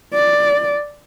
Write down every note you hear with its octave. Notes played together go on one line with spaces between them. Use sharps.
D5